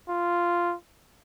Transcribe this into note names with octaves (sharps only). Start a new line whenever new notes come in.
F4